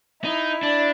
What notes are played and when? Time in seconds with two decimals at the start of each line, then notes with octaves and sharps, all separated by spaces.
0.24 D#4 E4
0.63 D4